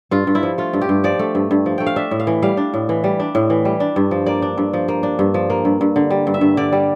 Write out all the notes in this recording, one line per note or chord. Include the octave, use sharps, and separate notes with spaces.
G2 F4
G2
E4
F3
A3 F4
G2
G4
G2
F3 D5
A3
G2
G2
F3
A3 G5
F5
D4 E5
A2
F5
E3
G3 F5
D4
A2
E3
G3
D4
A2
E3
G3
D4
G2
F3
A#3 D5
D4
G2
F3
A#3
D4
G2
F3
A#3
G2
G2
D3
G3
G2
E5
G2
D3 D5
G3